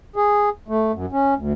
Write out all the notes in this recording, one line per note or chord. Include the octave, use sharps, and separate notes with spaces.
G#4
A3
F#2
C#4
D2